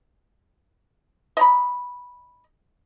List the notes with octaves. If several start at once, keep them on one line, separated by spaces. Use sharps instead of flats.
D#5 A#5 B5